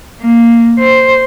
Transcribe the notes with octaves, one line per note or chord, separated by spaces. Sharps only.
A#3
C5